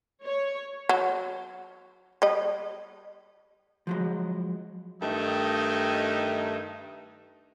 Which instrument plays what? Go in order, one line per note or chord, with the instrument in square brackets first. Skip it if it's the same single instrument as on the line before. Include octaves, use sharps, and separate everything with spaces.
[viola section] C#5
[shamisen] F#3
G3 D#5
[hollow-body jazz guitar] F3 F#3 G#3
[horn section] G2 D#3 A3 D#4